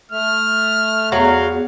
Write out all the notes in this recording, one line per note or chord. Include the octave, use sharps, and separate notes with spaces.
A3 F6
E2 F#3 F5